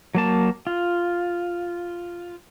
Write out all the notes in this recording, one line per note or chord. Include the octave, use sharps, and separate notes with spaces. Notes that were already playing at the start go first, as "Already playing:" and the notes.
F#3 A#3 A5
F4